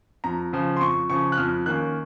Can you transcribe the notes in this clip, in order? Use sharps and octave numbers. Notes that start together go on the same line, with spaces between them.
F2 A#5
C#3 F3
C6
F2 C#6
C#3 F3 C#6
F#6
F2 F6
D#3 A#3 C#4 F#6